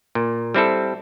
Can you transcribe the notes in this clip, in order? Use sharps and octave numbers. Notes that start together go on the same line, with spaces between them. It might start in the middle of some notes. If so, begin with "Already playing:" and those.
A#2
G3 C4 E4 A4